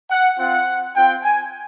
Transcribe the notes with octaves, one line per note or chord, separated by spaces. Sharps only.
F#5
C4 F4 F#5
C4 F4 G5
G#5